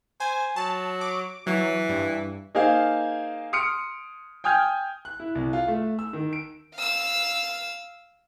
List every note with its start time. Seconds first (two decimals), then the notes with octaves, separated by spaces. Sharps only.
0.20 C5 G#5
0.56 F#3 A5
1.01 D6
1.47 E3 F#3
1.89 G2
2.55 A#3 D#4 G#4 C5 F5
3.53 C6 D#6 F6 C#7 D7
4.44 G5 G#5 D#6 F6 G6 G#6
5.05 F#6
5.20 E4
5.35 C2
5.53 F4
5.68 A3
5.99 E6
6.13 D#3
6.33 D7
6.75 F5 E6